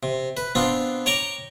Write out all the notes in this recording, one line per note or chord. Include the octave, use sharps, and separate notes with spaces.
C3
B4
B3 C4 D4 F4
C#5 G5 A#5 C#6 D6